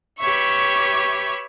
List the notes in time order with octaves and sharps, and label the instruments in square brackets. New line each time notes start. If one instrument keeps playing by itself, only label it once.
[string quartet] G4 B4 C#5 E5 C#6